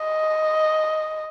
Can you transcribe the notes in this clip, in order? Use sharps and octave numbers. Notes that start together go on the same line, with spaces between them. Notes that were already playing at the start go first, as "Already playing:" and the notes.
Already playing: D#5